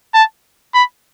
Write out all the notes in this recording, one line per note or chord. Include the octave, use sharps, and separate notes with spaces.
A5
B5